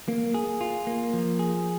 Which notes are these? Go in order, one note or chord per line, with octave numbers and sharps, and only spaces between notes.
A#3
G#4
F4
A#3
F3
G#4